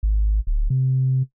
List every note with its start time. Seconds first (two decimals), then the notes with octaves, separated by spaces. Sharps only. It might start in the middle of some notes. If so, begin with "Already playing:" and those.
0.03 G#1
0.47 D1
0.70 C3